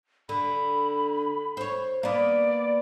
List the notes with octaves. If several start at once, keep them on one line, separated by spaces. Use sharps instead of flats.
D3 B5
C5 C#5
A#3 B3 D5